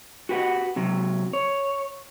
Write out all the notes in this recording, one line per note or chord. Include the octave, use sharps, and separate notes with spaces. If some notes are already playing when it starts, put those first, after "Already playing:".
F#4 G4 B4 F#5
C3 F#3
C#5